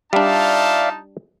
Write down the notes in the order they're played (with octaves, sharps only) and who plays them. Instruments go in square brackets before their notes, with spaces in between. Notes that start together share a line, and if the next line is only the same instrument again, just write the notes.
[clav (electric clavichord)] G3 D4 [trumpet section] D#4 F4 A5 [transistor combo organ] D5 E5 F5